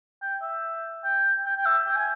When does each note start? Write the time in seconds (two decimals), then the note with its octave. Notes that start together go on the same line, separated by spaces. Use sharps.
0.22 G5
0.42 E5
1.04 G5
1.46 G5
1.57 G5
1.66 E5
1.87 G5
1.96 G#5